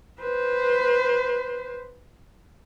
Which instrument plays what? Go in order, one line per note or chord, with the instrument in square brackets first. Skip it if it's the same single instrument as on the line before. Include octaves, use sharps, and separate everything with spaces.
[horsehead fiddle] B4 C5